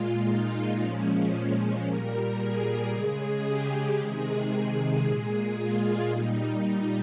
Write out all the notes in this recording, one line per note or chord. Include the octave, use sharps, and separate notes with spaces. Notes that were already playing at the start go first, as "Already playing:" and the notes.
Already playing: A#2 G#3 F4
D#4
A#2 F3 G#3 C#4
A#2 G3 A#4
G#4
C#3 G#3 G#4
G4
C3 D#3 G#3 G#4
A#2 G#3 G#4
F4
A#2 G3 D#4
D#4